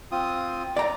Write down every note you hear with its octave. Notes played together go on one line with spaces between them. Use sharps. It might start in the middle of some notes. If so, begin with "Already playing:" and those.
C4 F4 D#6
D5 A#5